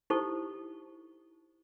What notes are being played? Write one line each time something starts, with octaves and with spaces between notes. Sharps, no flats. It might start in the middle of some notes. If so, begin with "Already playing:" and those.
D#4 E4 G4 A4 C5 C#6